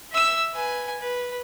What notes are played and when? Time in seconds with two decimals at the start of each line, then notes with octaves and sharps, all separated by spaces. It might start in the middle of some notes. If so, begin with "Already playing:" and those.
0.12 E5 E6
0.53 B4 G#5
1.00 B4